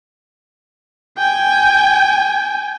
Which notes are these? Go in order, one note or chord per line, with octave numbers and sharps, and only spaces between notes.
G5 G#5